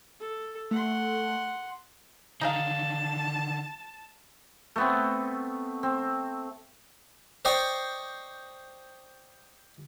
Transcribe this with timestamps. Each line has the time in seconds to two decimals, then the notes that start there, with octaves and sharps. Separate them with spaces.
0.20 A4
0.71 A3 F#5 C6
2.41 D3 D#3 D#4 G#4 F5 A5
4.76 A3 B3 C4
5.83 C4
7.45 C5 D5 D#5 G5 C#6